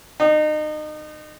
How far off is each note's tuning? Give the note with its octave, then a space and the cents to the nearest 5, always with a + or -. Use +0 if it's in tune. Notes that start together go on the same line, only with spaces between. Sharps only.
D#4 -30